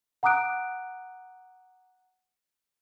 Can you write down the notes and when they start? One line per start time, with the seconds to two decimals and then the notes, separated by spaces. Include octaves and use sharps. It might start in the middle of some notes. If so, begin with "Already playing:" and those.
0.23 F#5 A#5 D6 D#6 F#6 D7